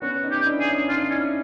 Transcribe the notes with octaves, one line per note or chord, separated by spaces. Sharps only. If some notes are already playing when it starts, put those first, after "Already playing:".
B3 C#4 F#4
C#4 D#4
G4
D4 E4
G#4
C#4 D#4
C#4 D#4 F4
C#4 D4 E4